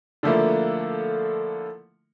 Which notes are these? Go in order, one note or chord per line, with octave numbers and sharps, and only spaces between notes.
D3 F3 A3 A#3 E4